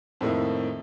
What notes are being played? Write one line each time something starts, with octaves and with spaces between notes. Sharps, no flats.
F2 A2 D#3 A#3 E4